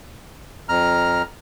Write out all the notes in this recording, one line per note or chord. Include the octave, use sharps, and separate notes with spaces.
F2 A#5 F6